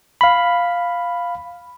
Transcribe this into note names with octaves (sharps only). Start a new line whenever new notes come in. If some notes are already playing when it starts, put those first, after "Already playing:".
F5 B5